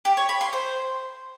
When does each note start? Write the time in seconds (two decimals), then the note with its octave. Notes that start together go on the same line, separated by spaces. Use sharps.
0.05 G4
0.17 C#5
0.29 B5
0.41 C6
0.53 C5